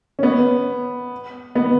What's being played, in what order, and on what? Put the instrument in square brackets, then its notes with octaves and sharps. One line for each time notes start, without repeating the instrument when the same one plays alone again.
[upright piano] C#4
B3
B3